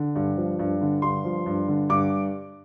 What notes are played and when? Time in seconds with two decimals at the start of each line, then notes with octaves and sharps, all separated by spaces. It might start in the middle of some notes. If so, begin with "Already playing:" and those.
Already playing: D3
0.15 G2
0.37 F3
0.59 G2
0.81 D3
1.02 G2 C6
1.24 F3
1.46 G2
1.68 D3
1.89 G2 D6